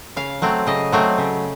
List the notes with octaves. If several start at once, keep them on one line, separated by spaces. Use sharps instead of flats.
C#3 F5
F#3 A3 C4
C#3 D#5
F#3 A3 C4
C#3